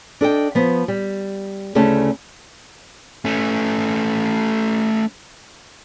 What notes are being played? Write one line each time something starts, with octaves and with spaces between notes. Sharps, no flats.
D4 A4 D#5 G5
F3 B3
G3
D2 C#3 A3 C#4 E4 A5
A3 C#4